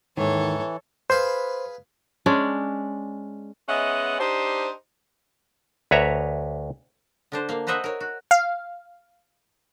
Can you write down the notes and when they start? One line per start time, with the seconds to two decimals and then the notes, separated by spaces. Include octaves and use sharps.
0.17 D#2 G#2 D#3 E3 A4 C#5
1.10 G#4 B4 C5 F5
2.26 G#3 C#4 D4
3.69 G#3 B3 C#4 D#5 E5 F#5
4.20 D4 D#4 G4 C5
5.91 D2 B4 C#5 E5 A#5
7.32 D3 D4 C5
7.49 A#3 F5
7.67 F#4 B4 C5 D#5 E5 F#5
7.84 A#4 C#5
8.00 F#4
8.31 F5